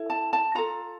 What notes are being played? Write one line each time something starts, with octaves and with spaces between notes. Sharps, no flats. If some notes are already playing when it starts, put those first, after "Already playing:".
Already playing: E4 A4
A5
A5
F4 A4 A#5